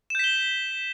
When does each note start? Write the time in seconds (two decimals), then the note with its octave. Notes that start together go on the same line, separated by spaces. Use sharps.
0.10 E7
0.15 G6
0.19 B6
0.24 G7